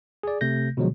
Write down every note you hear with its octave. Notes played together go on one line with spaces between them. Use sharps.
G#4 D5
C3 A3 G6 A#6
B2 D3 F3 F#3 G#3